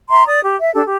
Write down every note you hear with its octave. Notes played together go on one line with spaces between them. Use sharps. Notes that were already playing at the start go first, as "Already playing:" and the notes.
E5 A#5 C6
D5 D#6
G4
E5
D4 G4 A4
G4